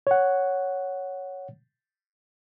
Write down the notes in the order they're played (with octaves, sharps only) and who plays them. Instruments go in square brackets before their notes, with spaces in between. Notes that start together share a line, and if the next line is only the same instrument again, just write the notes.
[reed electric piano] C#5 F#5